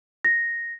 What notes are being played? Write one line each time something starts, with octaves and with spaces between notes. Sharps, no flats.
A#6